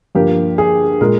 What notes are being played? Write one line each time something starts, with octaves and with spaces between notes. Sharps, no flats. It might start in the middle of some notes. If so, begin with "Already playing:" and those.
G2 F3 A#3 G4
G#4
A#2 G#3 A#4